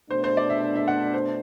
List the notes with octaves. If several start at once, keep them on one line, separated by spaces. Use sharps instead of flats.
B2 A3 D4 C5
C5
D5
E5
E5
F#5
C5